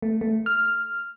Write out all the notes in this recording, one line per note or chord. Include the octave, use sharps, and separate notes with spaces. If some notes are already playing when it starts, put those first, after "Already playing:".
A3
A3
F6